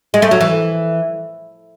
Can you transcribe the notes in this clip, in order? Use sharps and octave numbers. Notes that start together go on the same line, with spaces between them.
G#3
A3
F#3
E3